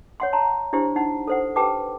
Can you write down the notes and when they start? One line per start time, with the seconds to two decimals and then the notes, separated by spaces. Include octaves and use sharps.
0.20 C#5 F#5 C6
0.33 A5 A#5 C6
0.73 D4 E4 G4 C5
0.96 D#4 F#5
1.27 A4 C5 F#5
1.56 G4 B4 G5 A5 D6